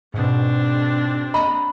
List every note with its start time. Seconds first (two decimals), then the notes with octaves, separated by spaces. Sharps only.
0.14 G#2 B2 C4 D4
1.34 D#5 A#5 B5